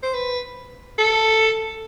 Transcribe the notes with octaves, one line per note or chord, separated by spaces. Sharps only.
C5
B4
A4